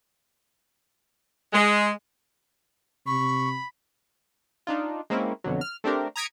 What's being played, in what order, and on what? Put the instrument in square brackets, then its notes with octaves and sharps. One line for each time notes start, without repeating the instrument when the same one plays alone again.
[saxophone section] G#3
[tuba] C3 [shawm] B5 [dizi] C#6
[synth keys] D4 D#4 F4
G#3 A#3 C4 C#4 E4
F2 B2 D3 F#3
F6
A3 C4 D4 G4 A#4
A#5 D#6 G#6 B6 C#7 D7